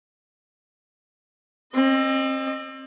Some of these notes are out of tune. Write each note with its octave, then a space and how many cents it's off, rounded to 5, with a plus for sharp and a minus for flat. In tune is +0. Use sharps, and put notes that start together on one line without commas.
C4 +35 D#5 -25